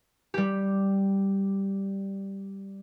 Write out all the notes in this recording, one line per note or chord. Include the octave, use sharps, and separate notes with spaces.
G3 G4